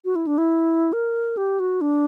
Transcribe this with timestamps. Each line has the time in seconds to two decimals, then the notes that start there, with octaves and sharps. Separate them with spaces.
0.05 F#4
0.16 E4
0.27 D4
0.38 E4
0.93 A#4
1.37 G4
1.60 F#4
1.81 D4